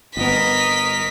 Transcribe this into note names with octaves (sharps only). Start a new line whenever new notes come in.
G1 B3 A#4 D#5 B6